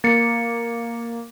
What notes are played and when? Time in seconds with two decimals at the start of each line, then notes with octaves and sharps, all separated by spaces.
0.04 A#3 A6 C#7